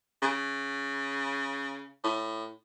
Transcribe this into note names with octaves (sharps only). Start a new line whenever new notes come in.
C#3
A2